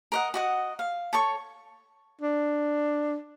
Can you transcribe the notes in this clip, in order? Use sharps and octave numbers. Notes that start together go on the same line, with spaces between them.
A#4 D#5 F#5
F#4 D#5 F#5
F5
A4 C#5 C#6
D4